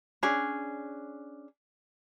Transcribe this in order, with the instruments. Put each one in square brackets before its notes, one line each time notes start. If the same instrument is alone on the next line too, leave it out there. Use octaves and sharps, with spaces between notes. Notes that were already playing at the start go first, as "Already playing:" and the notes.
[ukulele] C#4 D4 G#4